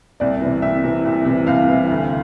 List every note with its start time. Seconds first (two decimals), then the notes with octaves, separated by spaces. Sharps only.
0.20 C2 D5
0.41 C3 E3
0.62 C2 E5
0.84 C3 E3
1.05 C2
1.26 C3 E3
1.47 C2 F5
1.68 C3 E3
1.90 D2